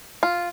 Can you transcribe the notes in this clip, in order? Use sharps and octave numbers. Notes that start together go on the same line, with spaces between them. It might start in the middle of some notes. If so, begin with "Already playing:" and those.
F4